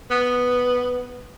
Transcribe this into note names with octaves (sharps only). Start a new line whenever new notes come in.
B3